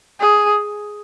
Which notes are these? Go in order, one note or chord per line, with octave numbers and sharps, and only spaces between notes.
G#4